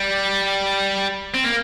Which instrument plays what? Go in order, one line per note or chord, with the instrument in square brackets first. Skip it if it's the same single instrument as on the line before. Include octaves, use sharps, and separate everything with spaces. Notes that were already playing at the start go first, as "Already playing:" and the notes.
Already playing: [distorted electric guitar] G3
C4
A#3